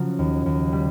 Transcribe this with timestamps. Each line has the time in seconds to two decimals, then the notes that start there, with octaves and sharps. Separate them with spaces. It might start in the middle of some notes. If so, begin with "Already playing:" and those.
Already playing: C#3 F3 F#3 F#4
0.19 D#2
0.46 D#2
0.72 G3